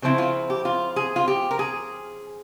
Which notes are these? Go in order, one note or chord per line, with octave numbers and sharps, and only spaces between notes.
C#3 F3 C4 E4 C5
F4
G4
F4
G#4
F4
G4
A#4
G#4